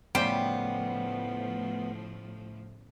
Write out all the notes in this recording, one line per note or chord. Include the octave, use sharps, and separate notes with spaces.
A2 C#3 F3 G3 B3 C5 G5